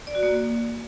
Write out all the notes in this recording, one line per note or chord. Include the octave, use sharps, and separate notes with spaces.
D5
F#4
A#3